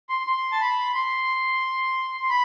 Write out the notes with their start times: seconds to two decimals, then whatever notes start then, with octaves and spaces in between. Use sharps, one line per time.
0.09 C6
0.27 C6
0.52 A5
0.61 B5
0.94 C6
2.22 C6
2.29 B5